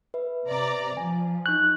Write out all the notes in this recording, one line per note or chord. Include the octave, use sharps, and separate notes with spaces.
B4 E5
C3 D5 A#5
F3 G#5
D#4 C#6 F#6 G6